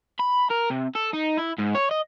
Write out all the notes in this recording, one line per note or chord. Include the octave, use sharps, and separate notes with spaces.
B5
A#4
C3
A4
D#4
E4
G#2
C#5
D#5